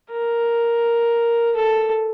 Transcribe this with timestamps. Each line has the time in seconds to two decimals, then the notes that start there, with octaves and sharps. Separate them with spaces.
0.11 A#4
1.56 A4